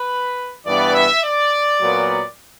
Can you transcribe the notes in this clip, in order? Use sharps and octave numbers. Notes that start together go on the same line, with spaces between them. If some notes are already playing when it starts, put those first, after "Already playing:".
Already playing: B4
G2 E3 B3 D5
E5
D5
A#2 F#3 B3